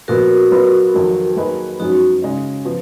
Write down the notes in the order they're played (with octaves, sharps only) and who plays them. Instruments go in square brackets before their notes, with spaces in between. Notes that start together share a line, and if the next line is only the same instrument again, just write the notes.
[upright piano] A#2 F3 B3 [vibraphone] F#4 A#4
[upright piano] F#3 B3 F4 B4
F2 D#3 F#3
F#3 A#3 D#4 G#4 B4
[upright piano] F#2 F3 G#3 C#4 [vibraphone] D#4 F#4
[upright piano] C#3 G#3 D#4
F3 B3